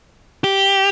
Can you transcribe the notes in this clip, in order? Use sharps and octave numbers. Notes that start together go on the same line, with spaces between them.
G4